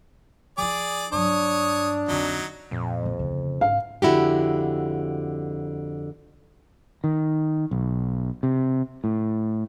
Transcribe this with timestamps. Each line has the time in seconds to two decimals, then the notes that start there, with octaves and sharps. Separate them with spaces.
0.58 F3 E4 G#4 D5 D6
1.13 G2 F#3 D4 C#5 D#6
2.08 F2 D3 F#3 D#4
2.71 F2 A#2
3.03 C2 A#3
3.19 D2 C#3
3.61 G#2 C#4 F5
4.02 F2 D3 E4 F#4 G4
7.04 D#3
7.71 B1
8.43 C3
9.04 A2